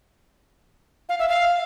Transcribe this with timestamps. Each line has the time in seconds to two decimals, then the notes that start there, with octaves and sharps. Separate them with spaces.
1.09 F5
1.19 E5
1.29 F5